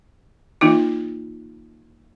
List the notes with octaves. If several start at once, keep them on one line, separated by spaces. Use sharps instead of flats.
E3 A#3 D#4 F4